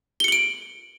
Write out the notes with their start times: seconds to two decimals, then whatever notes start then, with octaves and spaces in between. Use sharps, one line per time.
0.20 G7
0.24 C#7
0.28 F#7
0.32 D7